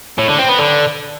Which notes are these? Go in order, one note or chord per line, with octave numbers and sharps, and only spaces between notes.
A2
D3
C4
B3
D3